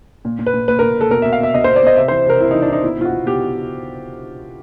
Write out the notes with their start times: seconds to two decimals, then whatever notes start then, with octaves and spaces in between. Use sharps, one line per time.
0.25 A#2
0.39 A#2
0.46 B4
0.54 A#2
0.68 A#2 B4
0.79 A#2 A#4
0.97 A#2 A4
1.11 B2 A#4
1.22 B2 E5
1.33 F5
1.40 B2 E5
1.54 B2 D#5
1.64 B2 C5
1.76 D5
1.83 B2 D#5
1.97 C3 E5
2.08 E3 C5
2.26 C3 A#4
2.40 C3 E4
2.51 E3 D#4
2.62 D4
2.69 E3 D#4
2.83 B2 E4
2.97 B2 F4
3.05 F#4
3.12 B2
3.26 B2 G4